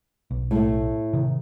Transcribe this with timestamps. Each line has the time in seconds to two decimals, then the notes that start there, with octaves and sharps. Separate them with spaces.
0.31 B1
0.51 A2 A3
1.13 C3 D#3